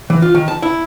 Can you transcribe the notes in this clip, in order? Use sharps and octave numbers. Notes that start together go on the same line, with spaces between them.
E3
F4
D#3
A5
E4